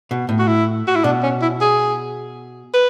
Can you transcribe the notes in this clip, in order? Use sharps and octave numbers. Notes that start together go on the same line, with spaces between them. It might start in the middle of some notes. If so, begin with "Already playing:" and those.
B2
A2
F#4
E4
F#4
E4
B2 D4
C#4
E4
G#4
B4